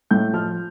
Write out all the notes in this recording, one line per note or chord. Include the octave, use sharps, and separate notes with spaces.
A2 G6
F3 F6